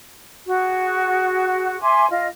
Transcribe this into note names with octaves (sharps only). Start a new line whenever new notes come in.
F#4 G#4
E5 G#5 C6 D6
F4 D#5